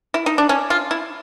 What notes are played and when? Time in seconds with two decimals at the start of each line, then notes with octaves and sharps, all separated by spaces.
0.14 E4
0.26 D#4
0.38 D4
0.49 C#4
0.70 F4
0.91 E4